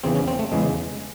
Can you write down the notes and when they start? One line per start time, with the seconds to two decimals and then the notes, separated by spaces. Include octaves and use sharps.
0.04 E2 C#3 E3 C4
0.15 C#4
0.28 C4
0.39 A3
0.52 E2 C#3 E3 G#3